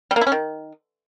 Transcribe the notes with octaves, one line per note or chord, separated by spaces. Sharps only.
G3
A#3
E4
C#4
D#3